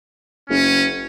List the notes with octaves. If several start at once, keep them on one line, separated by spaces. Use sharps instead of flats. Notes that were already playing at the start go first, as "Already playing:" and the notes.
F#1 C#4